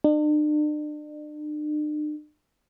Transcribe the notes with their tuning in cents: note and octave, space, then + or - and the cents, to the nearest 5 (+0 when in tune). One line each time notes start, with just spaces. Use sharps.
D4 +45